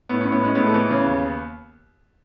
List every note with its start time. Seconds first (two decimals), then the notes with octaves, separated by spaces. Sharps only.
0.09 A2 B3
0.20 C#4
0.26 A2
0.32 B3
0.41 G#3 C#4
0.55 A2 B3
0.66 A3
0.74 E3 B3
0.90 C#3
1.06 D#2